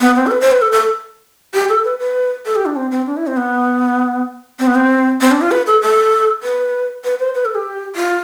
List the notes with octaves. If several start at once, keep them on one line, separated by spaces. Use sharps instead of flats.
B3
C4
A4
B4
C5
B4
A4
A4
G4
A4
B4
B4
A4
G4
D4
C4
C4
D4
E4
C4
B3
C4
B3
C4
C4
D4
F4
B4
A4
A4
B4
B4
C5
B4
A4
G4
F4